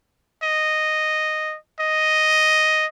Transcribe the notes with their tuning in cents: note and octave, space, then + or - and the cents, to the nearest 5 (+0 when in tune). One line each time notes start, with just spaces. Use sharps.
D#5 -5
D#5 +0